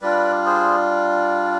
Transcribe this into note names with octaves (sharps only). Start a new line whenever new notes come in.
G3 D4 F4 B4 D5
G#4 C5